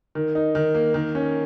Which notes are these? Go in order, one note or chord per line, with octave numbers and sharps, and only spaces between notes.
D#3
D#4
D#3
A#3
D#3
C#4